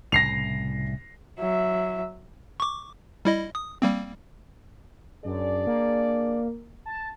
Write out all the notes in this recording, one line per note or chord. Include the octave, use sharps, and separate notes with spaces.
C2 A2 C#3 A#6 C7 F7
F#3 E5
C#6 D6
G3 E4 D#5
D#6
G3 A#3 C4
F#2 D4 G#4 D5
A#3
A5